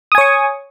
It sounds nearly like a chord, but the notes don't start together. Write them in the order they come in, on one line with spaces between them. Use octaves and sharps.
D#6 G#5 C#5 C#6